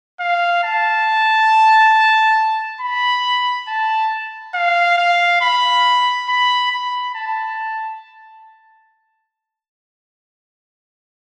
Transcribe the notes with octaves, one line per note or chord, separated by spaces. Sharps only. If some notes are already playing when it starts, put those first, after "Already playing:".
F5
A5
B5
A5
F5
F5
B5
B5
B5
A5